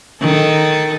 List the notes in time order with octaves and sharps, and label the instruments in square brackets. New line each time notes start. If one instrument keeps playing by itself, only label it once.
[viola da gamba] D#3 A4